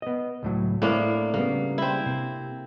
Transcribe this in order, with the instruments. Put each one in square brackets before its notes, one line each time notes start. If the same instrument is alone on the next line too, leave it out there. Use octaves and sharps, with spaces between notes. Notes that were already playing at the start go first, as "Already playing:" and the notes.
[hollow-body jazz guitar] B3 D#5
C#2 A2 F#3
[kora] A2 A#3 D4 [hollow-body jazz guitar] C4
[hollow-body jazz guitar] C#3 G3 B3 [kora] A#3
[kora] C4 E4
[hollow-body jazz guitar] C3